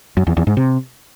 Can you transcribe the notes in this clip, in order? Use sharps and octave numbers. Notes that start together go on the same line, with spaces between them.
F#2
E2
E2
G#2
C3